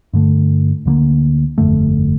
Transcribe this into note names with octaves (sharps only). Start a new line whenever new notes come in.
G2 D3 A3
D2 D3 G3 A#3
G1 F2 D3 A3